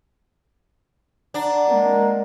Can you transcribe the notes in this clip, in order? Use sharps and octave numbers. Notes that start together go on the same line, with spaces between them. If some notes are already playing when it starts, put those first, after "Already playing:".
D4 F#5 A#5
G#3 A#3